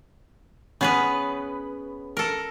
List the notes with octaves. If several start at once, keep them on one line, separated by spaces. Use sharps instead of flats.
B3 C#4 G#4 B4
A4 A#4